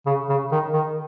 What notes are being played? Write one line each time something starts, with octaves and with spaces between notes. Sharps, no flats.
C#3
C#3
D#3
D#3